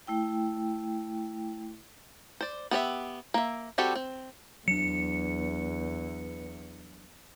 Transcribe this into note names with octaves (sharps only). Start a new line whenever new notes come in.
A3 E4 G5
C5 D5
B3 G4 D5 E5
A#3 E5
G3 C4 F#4 G4 A4
C4
E2 F#3 D4 C#7